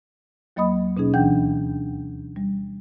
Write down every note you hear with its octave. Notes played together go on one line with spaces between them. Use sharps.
D#2 F#3 A#3 D#5 B5 D#6
B2 C#4 D#4 G#4
D2 E3 D4 F#5 G5 G6
G3